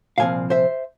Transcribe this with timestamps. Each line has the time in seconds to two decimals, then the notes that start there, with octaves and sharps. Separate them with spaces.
0.18 C2 A#2 F3 C4 F5 G#5
0.50 C5 E5